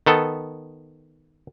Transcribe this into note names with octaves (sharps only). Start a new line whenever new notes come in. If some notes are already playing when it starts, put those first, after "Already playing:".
D#3 B3 A4